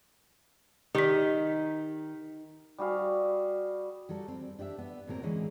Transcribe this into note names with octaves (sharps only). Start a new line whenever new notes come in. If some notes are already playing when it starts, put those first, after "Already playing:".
D#3 D#4 G4 B6
G3 F#4 G#4 F5
F#3 G3 F#4 A4
C4
D4 G4 D5 E5
B3
A2 F#3 A#3 C4 A#4
D3 E3 G#3 C4 C#4